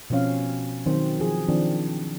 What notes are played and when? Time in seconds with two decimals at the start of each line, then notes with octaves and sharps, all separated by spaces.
0.10 B2 F3 C4 C#4 F5
0.86 D#3 F#3 C4 C5
1.20 F3 G#4
1.48 D#3 F3 C4 D4